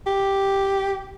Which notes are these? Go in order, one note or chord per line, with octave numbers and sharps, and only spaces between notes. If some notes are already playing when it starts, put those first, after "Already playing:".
G4